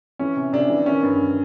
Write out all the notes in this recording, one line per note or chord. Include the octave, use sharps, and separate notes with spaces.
E3 C#4
C3
C3 D4
E3
D#3 C#4
G2